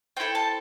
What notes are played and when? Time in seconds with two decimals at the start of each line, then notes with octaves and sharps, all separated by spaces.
0.17 C4 E4 A4 G5
0.35 A5